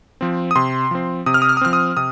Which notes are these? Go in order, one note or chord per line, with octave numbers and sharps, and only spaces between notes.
F3 C4
D#6
C3 C6
F3 C4
C3 D#6
F6
D#6
F6
D#6
F3 C4 F6
D#6
C3 D#6